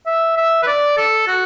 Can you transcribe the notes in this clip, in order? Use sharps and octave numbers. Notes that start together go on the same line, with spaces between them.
E5
E5
B4
D5
A4
F#4